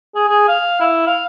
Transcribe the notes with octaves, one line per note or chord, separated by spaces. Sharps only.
G#4
G#4
F5
E4
F5